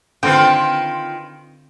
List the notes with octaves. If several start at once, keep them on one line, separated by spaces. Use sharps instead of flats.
D3 D#3 C4 F4 B4 G5